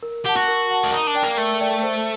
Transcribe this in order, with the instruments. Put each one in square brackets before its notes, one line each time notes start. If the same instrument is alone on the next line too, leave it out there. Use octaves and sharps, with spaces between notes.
[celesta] A#4
[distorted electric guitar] G4 [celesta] F#5 A5
[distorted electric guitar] F#4
[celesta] A#4
F#5 A5
[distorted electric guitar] D4
[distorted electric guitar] D#4 [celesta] A#4
[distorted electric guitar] D4
[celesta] D5 G5
[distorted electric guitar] A#3
[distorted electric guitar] A3 [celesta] A#4
[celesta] D5 G5
C5